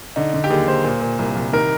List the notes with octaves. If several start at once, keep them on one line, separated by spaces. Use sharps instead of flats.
D3 D#4
D3
G4
D#2 G#4
D#2 C5
A#2
A#2
C2
C2
D#3 A#4